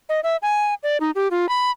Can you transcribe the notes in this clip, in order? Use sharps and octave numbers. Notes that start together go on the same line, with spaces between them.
D#5
E5
G#5
D5
D#4
G4
F4
B5